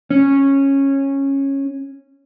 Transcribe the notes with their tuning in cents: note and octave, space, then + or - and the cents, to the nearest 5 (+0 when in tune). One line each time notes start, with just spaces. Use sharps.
C#4 -10